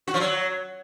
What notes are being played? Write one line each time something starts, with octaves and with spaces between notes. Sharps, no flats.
F#4
F3
F#3